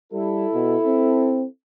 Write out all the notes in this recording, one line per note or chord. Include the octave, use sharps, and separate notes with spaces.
G3 E4 A4
B2
C4